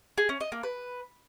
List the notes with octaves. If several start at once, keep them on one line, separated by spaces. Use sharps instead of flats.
G#4
C#4
D#5
A#3
B4